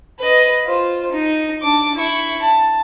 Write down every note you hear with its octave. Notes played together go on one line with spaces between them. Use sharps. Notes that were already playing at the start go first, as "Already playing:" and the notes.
B4 D#5
F4 C5
D#4
D4 D6
E4 C#6
A5